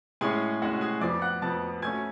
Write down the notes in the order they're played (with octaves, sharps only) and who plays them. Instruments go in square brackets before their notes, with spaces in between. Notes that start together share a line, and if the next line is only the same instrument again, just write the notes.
[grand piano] A2 G#3 C#4 G#4 G#5
A2 G#3 C#4 F#4 F#5
G#4 G#5
F2 F3 B3 D5 D6
F#5 F#6
F2 F3 B3 A5 A6
B2 A3 C#4 G#5 G#6